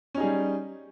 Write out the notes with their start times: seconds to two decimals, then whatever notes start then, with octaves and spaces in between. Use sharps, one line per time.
0.15 C#4
0.17 D#4
0.20 G#4
0.23 G3